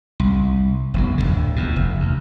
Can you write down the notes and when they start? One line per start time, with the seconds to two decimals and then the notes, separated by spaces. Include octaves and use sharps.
0.20 C2
0.94 F1 B1 F#3
1.18 D1 G#1 D3
1.56 E2 B2
1.76 F1
2.00 D2